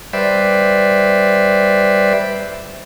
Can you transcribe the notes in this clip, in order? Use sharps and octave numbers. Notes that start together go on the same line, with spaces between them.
G3 B4 C5 D5 E5